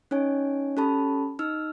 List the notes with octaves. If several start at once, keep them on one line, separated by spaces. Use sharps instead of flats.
C#4 D#4 C#5 G#5
C#4 G4 A4 A5 B5
D#4 E6 F6